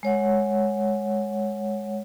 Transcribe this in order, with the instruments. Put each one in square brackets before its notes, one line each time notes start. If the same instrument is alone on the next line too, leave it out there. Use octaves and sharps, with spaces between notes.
[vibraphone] G#3 C#5 F#5